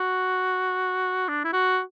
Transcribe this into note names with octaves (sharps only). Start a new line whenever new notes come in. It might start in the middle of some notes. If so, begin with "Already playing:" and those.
Already playing: F#4
D4
E4
F#4